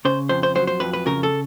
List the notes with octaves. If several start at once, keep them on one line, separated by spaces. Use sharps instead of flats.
C#3 C5
F2 C5
C5
F#3 C5
C5
F2 B4
B4
C#3 A#4
A4